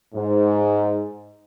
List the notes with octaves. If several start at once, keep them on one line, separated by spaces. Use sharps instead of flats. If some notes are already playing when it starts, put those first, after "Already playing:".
G#2